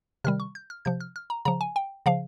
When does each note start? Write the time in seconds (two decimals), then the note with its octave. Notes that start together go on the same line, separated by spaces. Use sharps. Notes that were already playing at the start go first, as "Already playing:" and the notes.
0.24 C3 D#3 G3 F6
0.40 C#6
0.55 G6
0.70 F6
0.85 C3 F3 G6
1.01 F6
1.16 F6
1.30 A#5
1.45 C#3 F3 A#5
1.61 G#5
1.76 G5
2.06 C#3 F3 F5